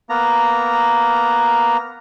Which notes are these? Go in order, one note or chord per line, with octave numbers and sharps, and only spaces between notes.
A#3 B3 A#5